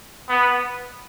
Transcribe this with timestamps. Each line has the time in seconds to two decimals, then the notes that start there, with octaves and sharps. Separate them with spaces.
0.29 B3